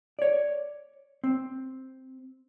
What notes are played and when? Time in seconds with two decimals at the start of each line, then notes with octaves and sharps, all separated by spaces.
0.19 C#5 D5
1.24 C4